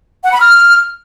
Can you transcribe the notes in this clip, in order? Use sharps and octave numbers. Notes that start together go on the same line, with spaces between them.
F#5
B5
F6